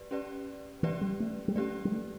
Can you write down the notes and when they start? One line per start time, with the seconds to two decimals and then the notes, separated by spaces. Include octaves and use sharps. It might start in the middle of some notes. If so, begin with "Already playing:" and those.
Already playing: G4 B4 D5
0.11 C#4 G4 B4 D5
0.83 E3 C#4 G4 B4 D5
1.01 G3
1.20 A3
1.48 G3
1.55 A3 C#4 G4 B4 D5
1.85 G3
1.92 A3